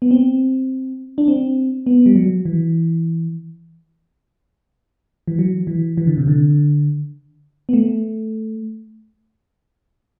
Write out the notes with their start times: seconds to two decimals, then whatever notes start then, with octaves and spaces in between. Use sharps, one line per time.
0.02 B3
0.11 C4
1.18 D4
1.28 C4
1.86 B3
2.06 G3
2.15 F#3
2.45 E3
5.28 E3
5.39 F#3
5.67 E3
5.97 E3
6.07 D3
6.18 C3
6.28 D3
7.69 B3
7.73 A3